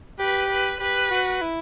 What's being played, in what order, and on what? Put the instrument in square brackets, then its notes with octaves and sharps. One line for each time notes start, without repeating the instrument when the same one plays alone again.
[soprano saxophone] G4 [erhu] B4
[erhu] B4
[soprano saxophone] G4 [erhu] B4
[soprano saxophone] F#4
E4